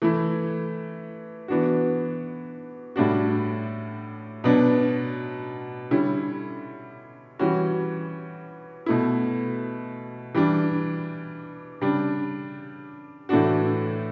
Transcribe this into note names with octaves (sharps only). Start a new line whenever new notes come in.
E3 A3 E4
E3 B3 D4 F#4
A2 G3 D4 F#4
B2 F#3 B3 D4
D3 G3 C#4 E4
E3 G3 C#4 F#4
B2 A3 E4
E3 G3 D4
C#3 G3 D4
A2 E3 A3 D4 F#4